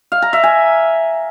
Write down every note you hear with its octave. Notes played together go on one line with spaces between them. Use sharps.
F5
A#5
E5
G#5